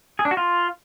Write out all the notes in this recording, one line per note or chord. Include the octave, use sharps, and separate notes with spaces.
G#4
D4
F#4
F4